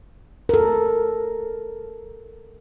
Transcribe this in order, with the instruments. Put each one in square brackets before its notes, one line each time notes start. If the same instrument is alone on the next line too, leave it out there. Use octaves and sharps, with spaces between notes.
[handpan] A4 A#4